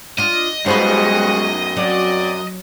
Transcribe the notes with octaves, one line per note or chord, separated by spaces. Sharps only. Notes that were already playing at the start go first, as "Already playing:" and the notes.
D4 F4 D#5
F#2 G3 G#3 D#4 F#4 G#4 B4 C5
F#3 C4 F#4 D5